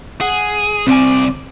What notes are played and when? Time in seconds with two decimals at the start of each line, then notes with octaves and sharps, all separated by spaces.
0.21 G#4 F#5
0.87 C2 C4 D5 G#5